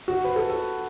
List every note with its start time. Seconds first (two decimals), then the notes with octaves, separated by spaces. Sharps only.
0.08 F#4
0.25 B4
0.36 A4
0.50 A4